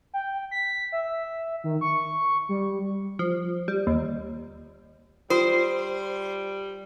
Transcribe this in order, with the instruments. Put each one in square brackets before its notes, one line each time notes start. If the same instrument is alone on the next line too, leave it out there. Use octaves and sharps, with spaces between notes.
[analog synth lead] G5
B6
E5
D#3
C#6
G3
[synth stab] F3
G3
D#2
[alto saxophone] G3 [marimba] F4 [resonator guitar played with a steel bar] C5